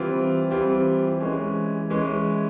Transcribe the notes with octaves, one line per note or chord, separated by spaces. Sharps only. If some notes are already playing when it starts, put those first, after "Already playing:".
Already playing: E3 G3 C4 F4
E3 G3 C4 F4
E3 G#3 C#4
E3 G#3 C#4